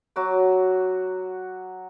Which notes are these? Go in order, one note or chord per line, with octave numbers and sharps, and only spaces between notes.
F#3 F#4 D6